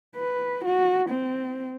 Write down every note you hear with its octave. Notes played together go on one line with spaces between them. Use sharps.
B4
F#4
C4